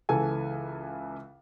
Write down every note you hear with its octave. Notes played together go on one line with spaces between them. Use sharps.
C#2 E3 A4 G#5